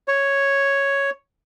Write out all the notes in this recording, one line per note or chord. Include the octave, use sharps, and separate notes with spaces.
C#5